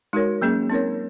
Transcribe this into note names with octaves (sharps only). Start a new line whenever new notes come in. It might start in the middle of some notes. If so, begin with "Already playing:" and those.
G#3 D#4 F#4 A#4 C#5
F#3 A#3 C#4 G#4
C4 D#4 A#4 C#5